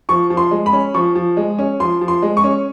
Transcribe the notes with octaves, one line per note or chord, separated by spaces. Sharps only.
F3 C#6
F3
C6
G#3
B5
C#4
F3 C#6
F3
G#3
C#4
F3 C6
F3
C6
G#3
C#6
C#4